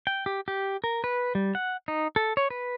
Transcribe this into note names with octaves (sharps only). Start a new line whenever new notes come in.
G5
G4
G4
A#4
B4
G3
F#5
D#4
A4
C#5
B4